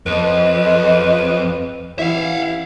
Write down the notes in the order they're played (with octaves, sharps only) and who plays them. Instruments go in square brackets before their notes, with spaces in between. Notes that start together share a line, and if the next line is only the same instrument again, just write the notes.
[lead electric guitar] F2 [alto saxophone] B4 [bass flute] D#5
[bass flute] E3 [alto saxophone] E4 [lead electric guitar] E5 F5